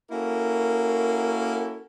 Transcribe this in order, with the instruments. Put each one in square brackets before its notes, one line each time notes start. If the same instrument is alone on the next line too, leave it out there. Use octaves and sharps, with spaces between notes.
[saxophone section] A#3 C#4 E4 F#4 A4 A#4